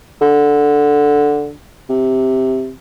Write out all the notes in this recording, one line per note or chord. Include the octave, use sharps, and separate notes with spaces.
D3
C3